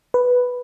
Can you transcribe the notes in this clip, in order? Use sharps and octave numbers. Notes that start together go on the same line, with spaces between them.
B4